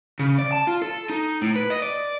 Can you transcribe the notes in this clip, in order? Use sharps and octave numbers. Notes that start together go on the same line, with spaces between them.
C#3
D5
A5
F4
A4
D#4
A2
B4
D#5
D5